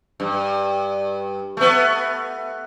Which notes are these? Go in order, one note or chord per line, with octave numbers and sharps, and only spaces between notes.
G2
A3 B3